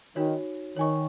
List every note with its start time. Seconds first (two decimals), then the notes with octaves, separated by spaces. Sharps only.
0.16 D#3 D#4 F#4 C#5
0.76 D#3 C#5 G#5 C#6